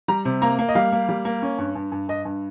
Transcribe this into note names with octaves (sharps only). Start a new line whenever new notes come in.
G3 A#5
C3
A#3 A#5
A#3
D#5
G3 F5
A#3
G3
A#3
C#4
G2
G2
G2
G2 D#5
G2